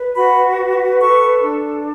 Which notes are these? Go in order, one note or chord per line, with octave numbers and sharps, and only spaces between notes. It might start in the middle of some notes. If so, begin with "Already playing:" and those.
Already playing: B4
F#4 B5
B4
A4 C#6
D4